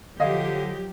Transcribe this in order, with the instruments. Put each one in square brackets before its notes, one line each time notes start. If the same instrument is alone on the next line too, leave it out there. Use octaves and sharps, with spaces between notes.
[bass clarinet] D3 [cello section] F3 F#3 G4 [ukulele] C#5 F5 [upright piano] D#5